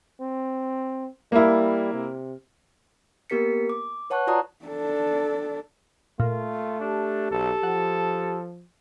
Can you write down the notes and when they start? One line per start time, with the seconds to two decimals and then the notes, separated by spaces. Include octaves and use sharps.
0.21 C4
1.32 G3 A#3 E4
1.93 C3
3.30 A#3 B3 G4 A#4 B6 C#7
3.69 D6
4.10 B4 C#5 F#5 A5 C#6 F#6
4.27 F4 F#4 D5 A5 A#5 D#6
4.65 D4 A4
6.20 A#2 A3 F4
6.80 D4 G4
7.31 B1 A4
7.63 F3 F#5